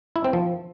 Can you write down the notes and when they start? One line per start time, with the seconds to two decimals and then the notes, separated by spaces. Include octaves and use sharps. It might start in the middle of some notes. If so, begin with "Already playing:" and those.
0.16 E4
0.24 C4
0.33 F3